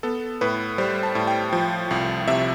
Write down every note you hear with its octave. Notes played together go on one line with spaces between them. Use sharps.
B3 A4
A2 B4
G3 C5
A5
A2
G5
F3
C2
C3 E5